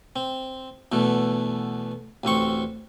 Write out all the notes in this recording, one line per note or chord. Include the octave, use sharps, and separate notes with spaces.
C4
E2 B2 A3
A1 D2 C4 C#6